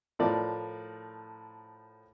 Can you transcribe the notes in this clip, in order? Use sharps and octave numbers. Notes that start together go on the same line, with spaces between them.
A2 F3 A#4 D5